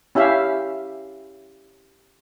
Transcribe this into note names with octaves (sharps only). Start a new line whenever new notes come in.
C#4 E4 G4 E5 F5